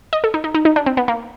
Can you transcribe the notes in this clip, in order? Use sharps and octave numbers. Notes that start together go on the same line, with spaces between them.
D#5
A4
D#4
D#4
D#4
D#4
D4
C4
B3
A#3